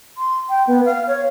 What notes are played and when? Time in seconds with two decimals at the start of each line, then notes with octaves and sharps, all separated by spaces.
0.18 C6
0.50 G5
0.67 B3
0.85 F5
1.08 C#5